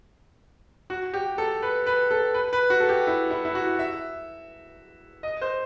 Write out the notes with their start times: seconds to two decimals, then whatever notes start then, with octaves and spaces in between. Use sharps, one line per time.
0.90 F#4
1.13 G4
1.38 A4
1.62 B4
1.86 B4
2.11 A4
2.34 B4
2.53 B4
2.70 F#4
2.80 A4
2.89 G4
3.07 E4
3.31 E4
3.45 E4
3.55 F#4
3.79 E5
5.23 D#5
5.41 C5